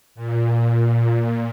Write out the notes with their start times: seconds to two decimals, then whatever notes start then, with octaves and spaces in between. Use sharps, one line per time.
0.15 A#2
0.97 A#2